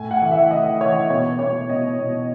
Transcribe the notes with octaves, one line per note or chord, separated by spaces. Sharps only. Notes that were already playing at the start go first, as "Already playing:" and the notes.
Already playing: A2 G#5
F#5
E3
E5
E3 D#5
E3 C#5
B2 C#5
B2 C#5
B2 D#5
B2